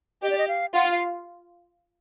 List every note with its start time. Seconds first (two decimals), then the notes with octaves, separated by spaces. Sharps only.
0.22 G4 D#5
0.30 D5
0.38 D#5
0.48 F5
0.74 F4 F#5
0.91 F5